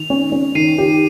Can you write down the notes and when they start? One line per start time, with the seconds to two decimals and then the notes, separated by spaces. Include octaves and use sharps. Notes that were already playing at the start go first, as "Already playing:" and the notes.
Already playing: D#3 F7
0.10 C#4
0.32 C#4
0.55 D#3 C7 D#7
0.78 G4